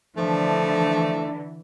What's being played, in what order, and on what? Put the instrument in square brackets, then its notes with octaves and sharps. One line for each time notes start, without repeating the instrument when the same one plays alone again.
[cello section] D3 E3 [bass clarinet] F3 [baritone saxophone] A3 [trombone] D4